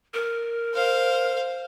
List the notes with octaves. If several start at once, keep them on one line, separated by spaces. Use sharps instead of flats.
A#4
C5 F5